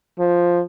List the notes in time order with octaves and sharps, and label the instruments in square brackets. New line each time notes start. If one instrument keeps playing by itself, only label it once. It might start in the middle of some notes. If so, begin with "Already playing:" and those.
[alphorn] F3